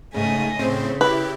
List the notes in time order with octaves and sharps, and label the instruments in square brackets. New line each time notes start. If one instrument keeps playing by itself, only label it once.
[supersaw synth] G#2 C#3 [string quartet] A3 D#5 G#5
[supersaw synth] A2 C4 C5 [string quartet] C#3
[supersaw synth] E4 G4 [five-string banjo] B4